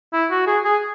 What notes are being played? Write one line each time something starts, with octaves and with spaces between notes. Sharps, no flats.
E4
F#4
G#4
G#4